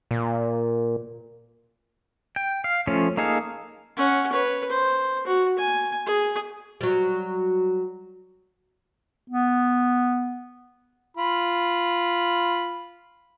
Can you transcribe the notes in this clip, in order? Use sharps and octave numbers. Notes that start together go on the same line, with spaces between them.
A#2
G5
F5
F3 A3 C#4
A#3 D#4 G#4 A4 F5
C#4 F#5
B4 C#5
C5
F#4
G#5
G#4
F#3 G3
B3
F4 B5